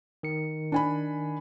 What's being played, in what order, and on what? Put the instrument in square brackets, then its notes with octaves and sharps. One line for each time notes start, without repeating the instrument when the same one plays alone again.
[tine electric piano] D#3 C#7
[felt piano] D4 G#5 B5